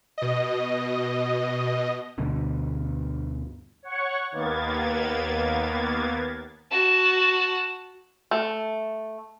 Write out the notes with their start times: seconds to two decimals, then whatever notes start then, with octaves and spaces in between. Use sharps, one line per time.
0.18 B2 D#5
2.18 D2 G2 B2 D3
3.83 C#5 F#5 C#6
4.32 D#2 A#3 B3 G#6 A6
6.71 F#4 A5
8.31 A3